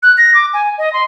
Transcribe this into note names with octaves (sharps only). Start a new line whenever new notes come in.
F#6
A#6
D6
G#5
D#5
C6